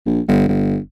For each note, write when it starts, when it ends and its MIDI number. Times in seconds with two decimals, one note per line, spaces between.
0.06 0.20 34
0.28 0.47 31
0.49 0.77 31